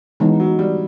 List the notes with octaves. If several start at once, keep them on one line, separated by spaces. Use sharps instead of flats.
E3 G#3 B3 D#4
F#3
G3